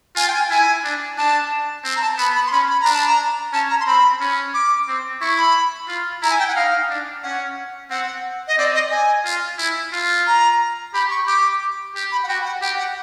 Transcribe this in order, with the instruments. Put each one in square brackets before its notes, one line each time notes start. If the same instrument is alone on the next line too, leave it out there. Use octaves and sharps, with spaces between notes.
[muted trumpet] F4 [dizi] G#5
[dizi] G5
G#5
[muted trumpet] E4 [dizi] G#5
[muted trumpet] D4
[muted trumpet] D4 [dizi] A5
[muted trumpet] C4
[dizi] A#5
A5
[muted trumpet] B3 [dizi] B5
[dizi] B5
C6
[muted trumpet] C#4 [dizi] B5
[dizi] B5
[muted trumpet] D4 [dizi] A#5
[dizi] A5
A#5
[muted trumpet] C#4 [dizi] A5
[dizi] A#5
C6
[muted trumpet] C4 [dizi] B5
[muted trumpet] C#4
[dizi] D6
[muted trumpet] C4
[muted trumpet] E4 [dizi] C#6
[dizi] B5
[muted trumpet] F4
[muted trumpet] E4 [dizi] A#5
[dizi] G#5
G5
F#5
[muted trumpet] D#4 [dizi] F5
[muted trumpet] D4
[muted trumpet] C#4 [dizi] F#5
[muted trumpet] C4 [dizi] F#5
[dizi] D#5
[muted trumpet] C4 [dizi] D5
[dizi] D#5
G#5
[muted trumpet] F4
E4
F4
[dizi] A#5
[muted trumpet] G4 [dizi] B5
[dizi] C#6
[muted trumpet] G4 [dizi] D6
[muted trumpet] G4
[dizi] B5
F#5
[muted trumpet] F#4 [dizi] G5
[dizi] F#5
[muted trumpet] G4 [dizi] G5
[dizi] F#5